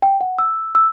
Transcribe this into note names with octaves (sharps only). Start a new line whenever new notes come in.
G5
F#5
E6
E6